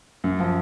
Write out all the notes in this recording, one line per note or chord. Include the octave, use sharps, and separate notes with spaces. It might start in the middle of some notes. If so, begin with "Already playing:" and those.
F#2
F3